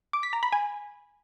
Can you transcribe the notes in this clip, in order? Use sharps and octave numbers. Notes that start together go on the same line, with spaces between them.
D6
B6
A#5
B5
G#5